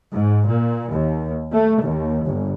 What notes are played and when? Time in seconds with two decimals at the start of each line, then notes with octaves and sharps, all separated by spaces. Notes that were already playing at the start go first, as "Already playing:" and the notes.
0.14 G#2
0.48 A#2
0.91 D#2
1.52 A3
1.83 D#2
2.25 G1